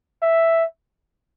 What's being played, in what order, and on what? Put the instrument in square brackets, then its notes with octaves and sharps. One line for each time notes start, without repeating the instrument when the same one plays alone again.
[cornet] E5